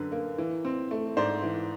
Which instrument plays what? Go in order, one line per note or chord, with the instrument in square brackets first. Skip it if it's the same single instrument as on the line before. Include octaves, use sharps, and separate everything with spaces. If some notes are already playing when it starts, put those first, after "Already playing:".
Already playing: [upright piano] F#2 D3 B4
A#3
E3
C4
A3
G#2 C5 D5
E3